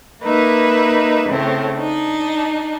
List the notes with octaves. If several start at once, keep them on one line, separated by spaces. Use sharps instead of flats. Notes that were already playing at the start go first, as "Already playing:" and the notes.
A#3 D#4 B4 E5
A2 C#3 C4
D4 D#4